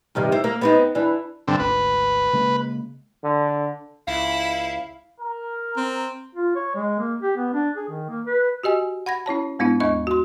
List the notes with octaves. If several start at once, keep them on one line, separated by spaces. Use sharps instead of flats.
G2 C3 D#3
E4 C5
A#3
B3 C4 D#4
E3 D4
G2 D3 C4
G#1 D2 G#2 B4
C#3 G#3 A#3
D3
C#2 E4 F5
A#4
C4
F4
C#5
G#3
A#3
G4
B3
D4
G#4
D#3
A#3
B4
F#4 G4 D#5 G#5
F#5 B5 G#6 A#6
C#4 E4 C#5 A5
G#2 G#3 B3 D4 E4
D#2 G#3 B3 D4 D#5 C#6
F#4 C6